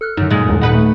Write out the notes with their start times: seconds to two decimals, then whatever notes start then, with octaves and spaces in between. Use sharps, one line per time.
0.01 A4 F6 F#6
0.17 F#2 D3 D#4
0.30 F#2 A#2 G#3
0.49 D#1
0.61 D#4 B4 F#5 B5 F#6
0.74 A3